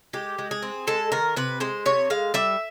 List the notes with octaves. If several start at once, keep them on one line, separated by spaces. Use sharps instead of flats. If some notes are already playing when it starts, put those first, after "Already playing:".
G#3 G4
G#3
G#4
C4
G#3 A4
D#3 A#4
C3 B4
G#3 C5
C3 C#5
G#3 F5
G3 E5